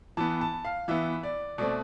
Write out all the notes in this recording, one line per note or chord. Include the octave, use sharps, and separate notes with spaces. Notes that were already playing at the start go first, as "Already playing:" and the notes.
E3 B3 A5
A5
F5
E3 B3 E5
D5
B2 A3 C4 D5